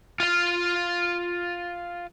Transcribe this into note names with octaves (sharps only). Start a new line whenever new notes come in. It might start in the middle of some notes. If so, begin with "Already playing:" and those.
F4 F5